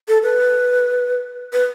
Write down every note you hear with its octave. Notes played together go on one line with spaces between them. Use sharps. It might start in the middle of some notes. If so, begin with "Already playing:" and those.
A4
B4
B4